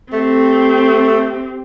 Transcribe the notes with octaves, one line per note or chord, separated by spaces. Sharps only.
A3 C4 G4